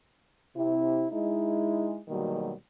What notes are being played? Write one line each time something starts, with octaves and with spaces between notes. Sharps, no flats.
C3 E4
G#3 D#4 E4
E2 B2 D#3 F#3 G3 A#3